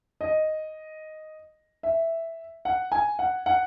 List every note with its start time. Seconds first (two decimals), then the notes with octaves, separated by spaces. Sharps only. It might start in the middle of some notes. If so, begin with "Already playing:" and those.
0.21 D#5
1.83 E5
2.65 F#5
2.92 G#5
3.19 F#5
3.46 F#5